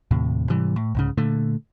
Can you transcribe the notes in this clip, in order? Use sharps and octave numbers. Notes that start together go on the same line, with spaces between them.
D#2 A2 C3
G#2 C3 E3 G3
A2
C2 G#2 C#3
A#2 D3 A3